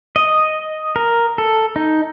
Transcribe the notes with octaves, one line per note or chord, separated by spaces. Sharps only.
D#5
A#4
A4
D#4